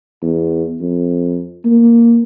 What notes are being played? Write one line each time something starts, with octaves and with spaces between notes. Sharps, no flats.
E2
F2
A#3